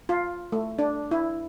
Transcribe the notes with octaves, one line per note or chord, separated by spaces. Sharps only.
F4
A3
D4
E4